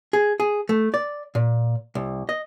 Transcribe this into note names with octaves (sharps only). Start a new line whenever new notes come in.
G#4
G#4
A3
D5
A#2
C2
D#5